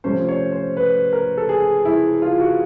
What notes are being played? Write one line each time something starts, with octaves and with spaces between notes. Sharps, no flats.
C3 F3 A3 C#4 C5
C#5
C5
B4
A#4
A4
G#4
E4
F4
F#4